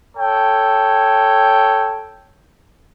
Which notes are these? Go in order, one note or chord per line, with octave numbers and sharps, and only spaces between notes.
A4 C#5 G5